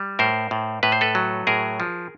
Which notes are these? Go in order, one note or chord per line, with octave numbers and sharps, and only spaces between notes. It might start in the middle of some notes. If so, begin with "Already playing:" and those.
Already playing: G3
A2 A#4 C5
A2
A2 B4
C5
A4 B4
F#3
A2 G#4 A#4
F3